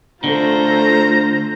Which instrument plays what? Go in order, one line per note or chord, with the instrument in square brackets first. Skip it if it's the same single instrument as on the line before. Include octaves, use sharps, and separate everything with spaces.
[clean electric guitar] D3 [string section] A3 [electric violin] F4 C5 [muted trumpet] A#5